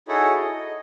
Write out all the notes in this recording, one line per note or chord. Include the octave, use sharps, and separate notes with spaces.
D#4 E4 F#4 G#4 A4 C#5
D#5